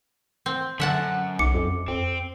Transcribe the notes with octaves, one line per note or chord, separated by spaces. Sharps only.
C4
F#2 D3 E5 F#5 A5
B1 D6 C#7
F2
F2 C4